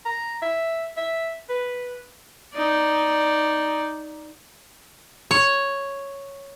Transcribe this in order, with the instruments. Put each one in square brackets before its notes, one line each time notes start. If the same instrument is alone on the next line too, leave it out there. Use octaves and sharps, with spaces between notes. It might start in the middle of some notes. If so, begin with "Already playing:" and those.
[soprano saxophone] A#5
E5
E5
B4
[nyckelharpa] D#4 D5
[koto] C#5